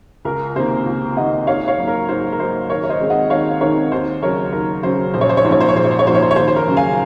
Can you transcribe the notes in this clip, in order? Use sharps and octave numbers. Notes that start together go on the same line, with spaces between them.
C#2 A#4
C3 D#3 A#3 C5
C#2
C3 D#3 A#3 D#5 F#5
G#2 C#5 F5
C#5 F5
F#3 A#3 D#4
A#4
G#2 C5
A#4
F#3 A#3 D#4 C5
D#2 A#4 C#5
C#5
C5 D#5
D#3 G#3 C4 D#4
D#5 F#5
D#2 C#5 F5
D#3 G#3 C4 D#4 A#4 C#5
D#2 C5
C#3 F#3 C#4 A#4 C#5
D#2 A#4
C#3 F#3 C#4 C5
A#1 C5
C#5
C5
C#5
G#2 F3 A#3 C#4 C5
C#5
C5
C#5
A#1 C5
C#5
C5
C#5
G#2 F3 A#3 C#4 C5
C#5
C5
C#5
D#2 C5
C5
A#4
C#3 F#3 C#4
F5 G#5